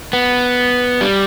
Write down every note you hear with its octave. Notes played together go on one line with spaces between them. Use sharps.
B3
G3